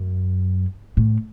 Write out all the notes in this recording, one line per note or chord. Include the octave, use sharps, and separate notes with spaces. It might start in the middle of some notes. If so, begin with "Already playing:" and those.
Already playing: F#2
A2